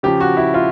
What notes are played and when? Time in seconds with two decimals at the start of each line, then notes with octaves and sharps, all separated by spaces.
0.03 C#3 F3 G4
0.20 F#4
0.37 E4
0.54 F4